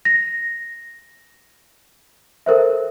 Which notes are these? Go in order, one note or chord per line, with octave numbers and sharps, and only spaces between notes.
A#6
A4 A#4 C5 E5